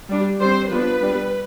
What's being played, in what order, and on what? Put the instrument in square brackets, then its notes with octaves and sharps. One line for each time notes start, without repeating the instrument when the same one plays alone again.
[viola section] G3 D4
G3 C4 C5
F3 B3 D4 B4
G3 B3 D4